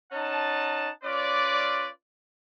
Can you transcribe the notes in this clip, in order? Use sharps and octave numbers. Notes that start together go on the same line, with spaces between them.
C#4 D#4 F#5 A5
C#4 F4 B4 D5